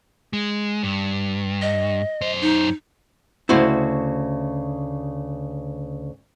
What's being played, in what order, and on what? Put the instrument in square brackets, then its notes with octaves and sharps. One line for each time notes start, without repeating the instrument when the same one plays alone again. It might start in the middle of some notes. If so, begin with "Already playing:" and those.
[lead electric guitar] G#3
G2
[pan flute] D#5
[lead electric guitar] F#2 C5
[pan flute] D#4
[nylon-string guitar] D2 C#3 [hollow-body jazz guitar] E4 F#4 C5